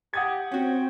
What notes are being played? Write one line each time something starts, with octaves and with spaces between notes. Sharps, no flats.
G4 F#5 D#6 G#6
C4 C#4 F#4 G5